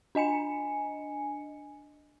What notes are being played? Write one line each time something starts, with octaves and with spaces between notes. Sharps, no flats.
D4 D#5 G#5 C#7